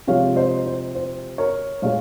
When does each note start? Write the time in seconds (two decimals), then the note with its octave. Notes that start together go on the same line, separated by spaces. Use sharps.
0.07 C3 F3 G#3 C#5 F5
0.36 C5 D#5
0.66 C5
0.95 C5
1.38 A#4 C#5
1.82 A#2 G#3 C#5 F5